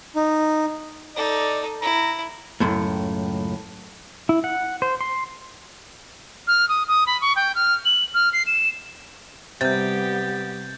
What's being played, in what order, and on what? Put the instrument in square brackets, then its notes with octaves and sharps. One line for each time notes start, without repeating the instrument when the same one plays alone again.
[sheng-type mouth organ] D#4
[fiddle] D#4 A4 [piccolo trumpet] D5
[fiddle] E4 [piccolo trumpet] A#5
[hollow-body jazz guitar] C#2 F#2 A2
[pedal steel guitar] E4
F#5
C5
C6
[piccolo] F6
D#6
D#6
B5
C#6
G5
F6
F#7
F6
C7
E7
[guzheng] C3 [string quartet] G3 B3 G4 [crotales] G6 A6